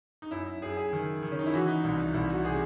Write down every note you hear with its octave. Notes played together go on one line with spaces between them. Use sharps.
D#4
F#2 E4
F#2 G#4
G#4
D#3
D#3
C#4
D#4
E4
E3 F#4
D#4
C2 E4
D#4
C2 E4
F#4
C3 G#4